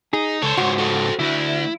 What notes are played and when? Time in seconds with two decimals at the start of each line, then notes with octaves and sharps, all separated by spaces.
0.13 D#4 G#4
0.43 C#2 A4 C5 C#5
0.58 C#2 G#2 F#4
0.78 A4 C5
1.19 D2 E4